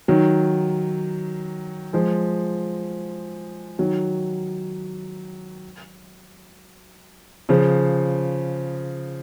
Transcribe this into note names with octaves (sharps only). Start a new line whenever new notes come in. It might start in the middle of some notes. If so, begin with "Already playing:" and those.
D#3 F#3
F3 G#3
D#3 F#3
C#3 F3